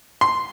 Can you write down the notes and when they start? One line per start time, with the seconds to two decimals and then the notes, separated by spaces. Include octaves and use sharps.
0.21 C6